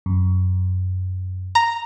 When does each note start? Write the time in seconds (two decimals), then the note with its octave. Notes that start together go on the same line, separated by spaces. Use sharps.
0.06 F#2
1.55 A#5